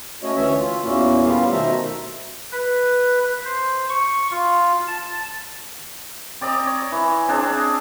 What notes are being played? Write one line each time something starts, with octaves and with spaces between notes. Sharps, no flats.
A3 C#4 F#4 C#5 D#5
D2 E3 C#4 C#5 E5
F4
E2 A#2 A#3 C#4 E4 F#4
G3 B3 C#4 F4 G4 F5
B2 D#3 A3 C5 E5 A#5
B4
C5
C#6
F4
A5
C4 D5 D#5 A#5
C#5
E3
C4 D4 G#4